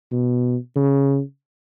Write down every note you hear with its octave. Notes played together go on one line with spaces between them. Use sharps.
B2
C#3